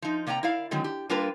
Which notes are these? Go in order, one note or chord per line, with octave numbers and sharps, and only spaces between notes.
F3 D#4
C3 A#3 D5 G5 A#5
E4 A#4 D5 F5
D3 D#3 F#3 G#3 C4
G4
G3 A#3 D4 F4 A#4 B4